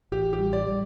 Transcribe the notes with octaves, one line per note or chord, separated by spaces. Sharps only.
A1 G4
G4
G3
D5
G3